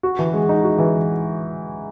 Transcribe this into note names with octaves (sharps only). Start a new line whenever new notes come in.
F#4
E3
G#3
D#4
F#4
E3